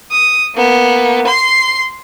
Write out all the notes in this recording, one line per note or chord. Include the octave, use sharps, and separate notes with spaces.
D#6
A#3 B3
C6 C7